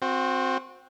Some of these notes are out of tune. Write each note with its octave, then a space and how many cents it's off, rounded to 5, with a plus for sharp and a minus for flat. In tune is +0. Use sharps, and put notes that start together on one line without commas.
C4 +5 F#4 -25